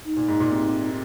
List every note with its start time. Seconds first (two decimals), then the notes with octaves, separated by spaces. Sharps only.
0.05 D#4
0.17 A#2
0.28 G#2
0.40 A#2
0.52 C3
0.67 C3
0.83 C3